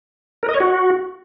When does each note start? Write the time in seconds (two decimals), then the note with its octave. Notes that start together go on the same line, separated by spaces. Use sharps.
0.43 A#4
0.49 D#5
0.54 C#5
0.60 F#4